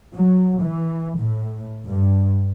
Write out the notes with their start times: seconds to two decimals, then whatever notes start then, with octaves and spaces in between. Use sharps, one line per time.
0.15 F#3
0.62 E3
1.19 A2
1.87 G2